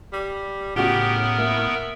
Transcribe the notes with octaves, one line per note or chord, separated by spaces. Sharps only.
G3
A2 C#3 B3 F#4 G4 A#4 F#5
A#3 E5